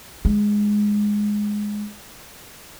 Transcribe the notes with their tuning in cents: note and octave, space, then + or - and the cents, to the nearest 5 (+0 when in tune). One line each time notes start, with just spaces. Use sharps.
G#3 +0 D#4 -5